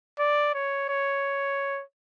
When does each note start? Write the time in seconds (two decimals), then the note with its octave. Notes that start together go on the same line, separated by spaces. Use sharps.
0.19 D5
0.54 C#5
0.89 C#5